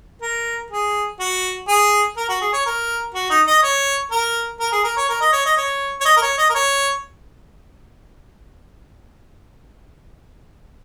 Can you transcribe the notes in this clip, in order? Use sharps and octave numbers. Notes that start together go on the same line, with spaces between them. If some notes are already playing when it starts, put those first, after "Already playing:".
A#4
G#4
F#4
G#4
A#4
F#4
G#4
C#5
A#4
F#4
D#4
D#5
C#5
A#4
A#4
G#4
A#4
C#5
A#4
D#5
C#5
D#5
C#5
C#5
D#5
A#4
C#5
D#5
A#4
C#5